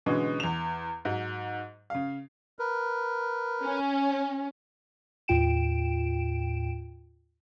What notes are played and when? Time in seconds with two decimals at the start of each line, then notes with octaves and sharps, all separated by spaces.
0.06 B2 D3 E3 G#3 C#4
0.40 E2 F7
1.05 G#2 F#3
1.90 C#3 F5
2.59 A#4 B4
3.63 C#4
5.28 D#2 A2 F4 G5 D7 E7